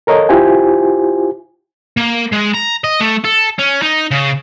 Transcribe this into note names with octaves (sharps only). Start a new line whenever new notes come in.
A4 A#4 C#5 D#5
E4 F4 G4 C5 G#5
A#3
G#3
A#5
D#5
A3
A4
C#4
D#4
C#3